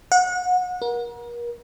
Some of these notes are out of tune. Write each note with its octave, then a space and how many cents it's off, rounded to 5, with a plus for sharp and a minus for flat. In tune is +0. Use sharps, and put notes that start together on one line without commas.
F#5 -30
A#4 +35